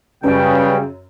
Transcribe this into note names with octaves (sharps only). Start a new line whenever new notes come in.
F#2 C#3 G3 B4 G5